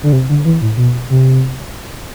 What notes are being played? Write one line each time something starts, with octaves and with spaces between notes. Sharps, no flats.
D3
C3
D3
E3
A2
B2
C3